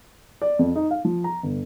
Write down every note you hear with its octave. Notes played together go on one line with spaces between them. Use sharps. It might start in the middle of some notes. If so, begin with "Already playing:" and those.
D5
F2
D#4
F5
F3
A#5
G1